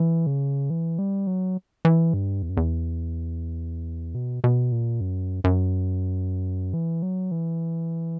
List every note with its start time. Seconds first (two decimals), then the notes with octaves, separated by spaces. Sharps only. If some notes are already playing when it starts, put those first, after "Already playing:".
Already playing: E3
0.27 C#3
0.70 E3
0.99 G3
1.27 F#3
1.85 E3
2.14 G2
2.42 E2
2.49 F#2
2.57 E2
4.15 B2
4.44 B2
4.72 A#2
5.01 F#2
5.44 F#2
6.74 E3
7.02 F#3
7.31 E3